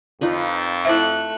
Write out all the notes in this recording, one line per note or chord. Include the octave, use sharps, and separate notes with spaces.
F2 D#4 F4 B4
A3 E4 C5 E5 F#6